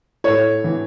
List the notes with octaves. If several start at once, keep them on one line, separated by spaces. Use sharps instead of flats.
A2 C#5
E3